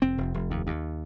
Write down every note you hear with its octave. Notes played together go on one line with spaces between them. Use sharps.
F1 C4
F1
F1
D#2
D#2